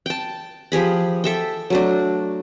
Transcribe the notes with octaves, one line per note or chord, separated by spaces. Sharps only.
G5 A5
F3 G4 G#4 B5
A4 E5 G5
F#3 A3 D4